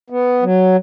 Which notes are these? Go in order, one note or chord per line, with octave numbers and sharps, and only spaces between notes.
B3
F#3